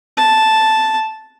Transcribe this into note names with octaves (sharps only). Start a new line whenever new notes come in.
A5